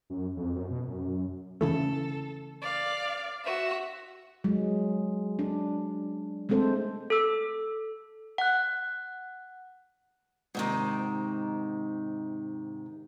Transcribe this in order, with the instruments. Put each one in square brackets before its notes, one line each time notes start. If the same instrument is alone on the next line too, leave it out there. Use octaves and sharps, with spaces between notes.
[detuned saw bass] F#2
F2
F#2
B2
F#2
[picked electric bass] C#3 E3 A3 [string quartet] A4
[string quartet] D5 F5
F#4 E5
[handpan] F#3 G#3
D4
G#3 A3 C4 A4 C5
[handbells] A4 E6
F#5 F#6
[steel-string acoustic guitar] G#2 C3 D#3